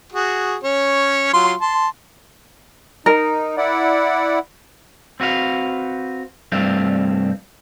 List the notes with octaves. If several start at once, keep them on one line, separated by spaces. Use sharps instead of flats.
F#4 G#4
C#4 C#5
F#3 F4 C6
A5 C6
D#4 A#4
E4 D5 F#5
C4 F#4 B4 F5
C2 G2 A3 C4 F5